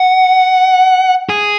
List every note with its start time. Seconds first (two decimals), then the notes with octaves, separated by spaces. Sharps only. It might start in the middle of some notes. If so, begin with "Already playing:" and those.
Already playing: F#5
1.29 G#4